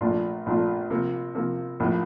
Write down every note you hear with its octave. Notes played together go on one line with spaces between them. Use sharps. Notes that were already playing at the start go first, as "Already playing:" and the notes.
A#1 A#2 A3 D4 F4
A#1 A#2 A3 D4 F4
C3 F3 A#3
C3 F3 A#3
A#1 A2 F3 A#3